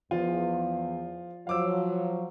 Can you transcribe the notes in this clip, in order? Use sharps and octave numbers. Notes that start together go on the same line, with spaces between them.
E2 F3 F4
F3 F#3 F5 D6 E6